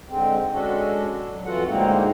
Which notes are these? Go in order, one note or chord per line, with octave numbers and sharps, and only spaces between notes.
G#2 D3 G#3 C4
G#3 C#4 D4 F#4 A4
F#3
F2 E3 F4 F#4 A4 F#5
A2 D3 G#3 A#3 C4 D#4